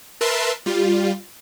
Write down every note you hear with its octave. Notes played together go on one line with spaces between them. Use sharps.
A#4 B4 E5 A5 C6
G3 F4